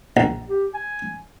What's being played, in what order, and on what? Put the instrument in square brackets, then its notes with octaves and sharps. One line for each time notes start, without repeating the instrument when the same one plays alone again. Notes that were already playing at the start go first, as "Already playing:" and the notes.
[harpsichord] A#1
[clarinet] G4
G#5